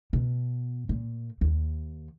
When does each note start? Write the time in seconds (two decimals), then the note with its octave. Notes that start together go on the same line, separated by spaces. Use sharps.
0.13 B2
0.89 A#2
1.41 D#2